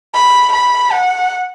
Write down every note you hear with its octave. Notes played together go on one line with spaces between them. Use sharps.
B5
B5
F#5